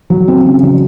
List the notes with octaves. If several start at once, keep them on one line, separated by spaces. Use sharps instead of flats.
F#3
C4
C#3
F#3